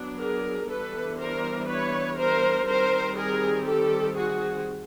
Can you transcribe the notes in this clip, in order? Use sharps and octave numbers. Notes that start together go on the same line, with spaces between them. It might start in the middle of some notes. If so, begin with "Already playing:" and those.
Already playing: F#3 B3 D4
G#4 A#4
E3 G3 B3 D4 A4 B4
A#4 C5
B4 C#5
A#4 C5
D#3 G3 C4 A#4 C5
G#4 A#4
G4 A4
F#4 G#4